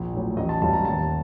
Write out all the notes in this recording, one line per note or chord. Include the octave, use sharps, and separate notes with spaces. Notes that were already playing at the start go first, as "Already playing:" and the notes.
Already playing: A#1
A2 F#3
A1 D#5
A5
G2 F#3 A5
A#5
D#2 A5